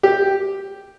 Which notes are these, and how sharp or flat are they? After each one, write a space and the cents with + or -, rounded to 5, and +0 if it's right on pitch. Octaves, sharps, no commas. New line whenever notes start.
G4 +0